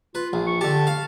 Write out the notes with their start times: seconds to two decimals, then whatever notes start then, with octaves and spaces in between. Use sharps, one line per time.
0.15 F4 B4
0.33 A#1
0.47 C#6
0.61 D3 G4 A5
0.87 F5